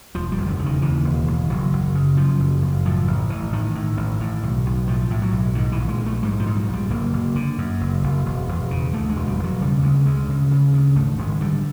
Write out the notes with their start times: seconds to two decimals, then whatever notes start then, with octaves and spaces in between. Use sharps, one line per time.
0.15 E1 F3
0.32 G3
0.38 E1
0.48 D3
0.59 C#3
0.66 D#3
0.82 D#2 E3
1.04 E1
1.27 E1
1.50 F#1 F#3
1.73 F#1
1.95 C#3
2.17 F#2 F3
2.40 F#1
2.62 F#1
2.85 A2 F3
3.07 A1
3.30 A1 E3
3.52 A2 D#3
3.75 A2
3.97 A1
4.20 A2
4.43 B1
4.66 B1
4.87 A2 F3
5.10 A2
5.22 F#3
5.32 B1
5.55 G#2 D#3
5.72 E3
5.78 A#1
5.89 G#3
6.00 A#1
6.06 A3
6.23 G#2 G3
6.40 F3
6.46 G#2
6.56 F#3
6.68 A#1
6.73 G3
6.90 F#1 A#3
7.13 F#1
7.36 D3
7.58 F#2
7.81 F#1
8.04 F#1
8.26 E1
8.48 E1
8.71 C#3
8.93 D2 A3
9.10 G#3
9.16 E1
9.28 G3
9.39 E1
9.44 F#3
9.61 C#3 G3
9.83 D2 G#3
10.05 D2 G#3
10.29 C#3
10.51 C#3
10.73 D2
10.96 G#1 A3
11.18 G#1 G#3
11.41 D3 G3